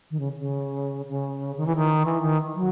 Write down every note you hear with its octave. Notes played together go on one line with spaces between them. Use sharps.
D#3
C#3
C#3
C#3
D#3
E3
D#3
E3
D#3
F#3